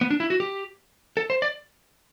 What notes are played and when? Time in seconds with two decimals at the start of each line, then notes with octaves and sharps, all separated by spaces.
0.01 B3
0.10 D4
0.20 E4
0.30 F#4
0.40 G4
1.17 A4
1.30 C5
1.42 D5